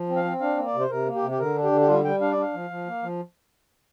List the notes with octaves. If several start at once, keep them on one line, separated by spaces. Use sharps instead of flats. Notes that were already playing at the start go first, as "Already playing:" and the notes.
Already playing: F3
C4
F5
C4
D4 F5
A#3
D5
C3
C5
C3 A#4
A#3
G4
C3
G4
D3 A#4
D4
G4
D3
G4
G3 F4
G3 G5
D4 F5
D5
D4 F5
F3
F3
A#3
F3